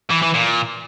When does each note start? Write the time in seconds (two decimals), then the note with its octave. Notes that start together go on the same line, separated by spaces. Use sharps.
0.11 E3
0.23 E3
0.35 A#2